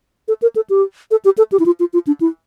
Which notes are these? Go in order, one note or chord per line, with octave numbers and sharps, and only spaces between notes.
A4
A#4
A4
G4
A4
G4
A4
G4
E4
F4
F4
F4
D4
E4